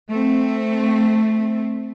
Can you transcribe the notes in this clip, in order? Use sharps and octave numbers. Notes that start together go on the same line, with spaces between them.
A3 C4